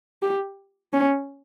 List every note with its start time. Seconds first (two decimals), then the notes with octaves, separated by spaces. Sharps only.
0.22 G4
0.93 C#4